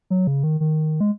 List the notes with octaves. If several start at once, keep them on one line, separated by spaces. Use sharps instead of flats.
F#3
C#3
D#3
D#3
G#3